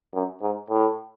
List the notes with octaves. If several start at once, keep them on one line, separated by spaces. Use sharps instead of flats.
F#2
G#2
A2